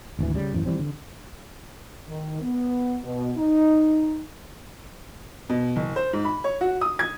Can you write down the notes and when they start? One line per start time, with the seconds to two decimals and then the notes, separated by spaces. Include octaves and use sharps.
0.19 G#1 D2 E3
0.35 C#3 G3
0.53 A1 F#2 E3
0.66 E3 G3 C4
0.79 D3
2.08 D#3
2.41 B3
3.04 B2
3.37 D#4
5.49 B2
5.76 F#1
5.96 C5
6.13 G#2
6.25 B5
6.44 C#5
6.61 F#4
6.81 D#6
6.99 G#6